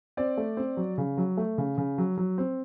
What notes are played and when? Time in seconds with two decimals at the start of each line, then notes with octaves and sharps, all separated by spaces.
0.17 C4 D5
0.37 A3
0.57 C4
0.77 F#3
0.98 C#3
1.18 F#3
1.37 A3
1.58 C#3
1.78 C#3
1.98 F#3
2.18 F#3
2.38 C4